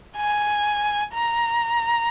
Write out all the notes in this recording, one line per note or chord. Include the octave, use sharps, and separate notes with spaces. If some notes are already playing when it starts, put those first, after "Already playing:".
G#5
A#5